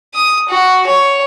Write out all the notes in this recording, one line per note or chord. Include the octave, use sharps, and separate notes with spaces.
D#6
F#4
C#5